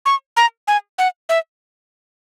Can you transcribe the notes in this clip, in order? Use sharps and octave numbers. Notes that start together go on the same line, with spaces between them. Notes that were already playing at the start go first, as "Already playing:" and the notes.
C#6
A#5
G#5
F#5
E5